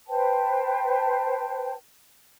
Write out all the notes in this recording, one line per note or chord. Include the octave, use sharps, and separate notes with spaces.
B4 C5 G5 A5